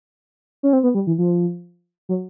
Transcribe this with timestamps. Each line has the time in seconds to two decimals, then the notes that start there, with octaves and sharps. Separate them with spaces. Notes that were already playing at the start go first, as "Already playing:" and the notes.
0.63 C#4
0.73 C4
0.83 B3
0.95 G3
1.07 E3
1.18 F3
2.09 F#3